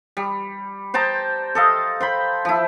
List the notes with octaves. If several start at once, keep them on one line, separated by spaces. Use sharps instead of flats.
G3
C5 G5 A5 A#5
A4 D#5 F5
C5 G5 B5
F3 E4